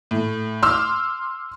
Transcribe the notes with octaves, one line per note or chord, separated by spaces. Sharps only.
A2
C6 D6 E6 F6